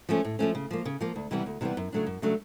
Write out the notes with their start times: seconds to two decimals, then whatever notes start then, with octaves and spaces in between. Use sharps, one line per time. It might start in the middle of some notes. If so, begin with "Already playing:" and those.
0.09 F3 A3 C#4
0.25 A2
0.39 F3 A3 C#4
0.55 C#3
0.71 F3 A#3
0.85 C#3
1.01 F3 A#3
1.16 D2
1.31 C3 E3 G3 B3
1.46 D2
1.61 C3 E3 G3 B3
1.77 F#2
1.92 C#3 F#3 A3 D4
2.06 F#2
2.22 C#3 F#3 A3 D4